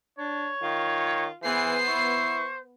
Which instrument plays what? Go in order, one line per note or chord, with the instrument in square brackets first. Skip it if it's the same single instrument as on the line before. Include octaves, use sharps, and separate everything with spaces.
[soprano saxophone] D4 [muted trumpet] C#5
[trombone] D#3 [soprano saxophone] F4
[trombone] E3 [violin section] B3 C7 [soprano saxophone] G#4 [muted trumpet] C5
[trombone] E4 [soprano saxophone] C#6